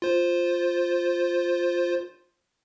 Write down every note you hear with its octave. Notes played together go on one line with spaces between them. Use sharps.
F4 C5